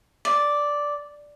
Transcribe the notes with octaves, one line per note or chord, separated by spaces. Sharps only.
D5